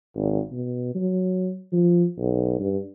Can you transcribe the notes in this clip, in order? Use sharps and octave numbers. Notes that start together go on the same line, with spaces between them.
G#1
B2
F#3
F3
B1
G2